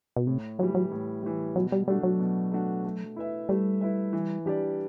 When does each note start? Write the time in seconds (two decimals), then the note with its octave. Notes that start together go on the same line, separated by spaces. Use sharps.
0.16 B2
0.27 A2 C3
0.59 E3 F#3 G3
0.75 F#3
0.91 A2
1.23 E3 G3
1.56 B2 F#3
1.72 G3
1.88 G3 A3 D4 F#4
2.03 F#3
2.20 B2
2.52 A3 D4 F#4
2.85 A3
3.16 E4 B4 E5
3.49 G3 A3
3.81 E4 B4 E5
4.13 E3
4.46 G3 D4 G4 D5